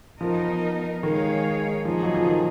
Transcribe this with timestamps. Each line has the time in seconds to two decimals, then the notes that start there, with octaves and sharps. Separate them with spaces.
0.20 F3 B3 D#4 A#4 D#5
1.03 D#3 G#3 D#4 G#4 C#5 F5
1.85 F3 A#3 D#4 G#4
2.02 F#3
2.14 F3
2.26 D#3